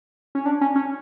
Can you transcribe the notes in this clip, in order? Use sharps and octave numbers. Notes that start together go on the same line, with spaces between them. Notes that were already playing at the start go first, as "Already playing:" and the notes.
C#4
D4
C#4
C#4